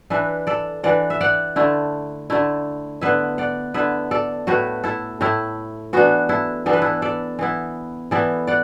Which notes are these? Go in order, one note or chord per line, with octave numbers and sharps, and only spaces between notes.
E3 D4 B4 E5
A4 D5
E3 D4 D5 F#5
E5
D5 F#5
D3 A3 E4
D3 A3 E4
D3 B3 E4 B4 E5
D5 F#5
D3 B3 E4 B4 E5
A4 D5
A2 A3 E4 F#4 B4
E4 A4
A2 A3 E4
E3 B3 D4 F#4
E4 A4
E3 B3 D4 A4
B4
E4 A4
A4 D5
E3 B3 E4
E3 B3 E4 A4 D5
D5 F#5